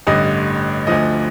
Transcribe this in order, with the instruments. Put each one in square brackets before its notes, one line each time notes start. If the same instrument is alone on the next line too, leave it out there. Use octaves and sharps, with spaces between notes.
[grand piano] A1 G2 D3 D#5
D2 D3 F3 D#5